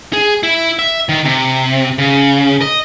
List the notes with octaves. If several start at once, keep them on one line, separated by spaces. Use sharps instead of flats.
G#4
E4
E5
D#3
C3
C#3
D#5